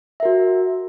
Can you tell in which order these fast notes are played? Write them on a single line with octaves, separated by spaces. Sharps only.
E5 A#4 F#4